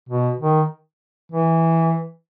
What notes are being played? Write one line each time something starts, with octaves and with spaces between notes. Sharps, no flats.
B2
D#3
E3